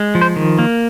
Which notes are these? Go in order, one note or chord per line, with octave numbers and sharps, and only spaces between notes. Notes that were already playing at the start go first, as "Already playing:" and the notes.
Already playing: G#3
F3
C5
D#3
A#3